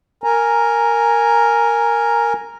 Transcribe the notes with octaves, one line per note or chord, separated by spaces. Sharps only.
A#4 G#5 A#5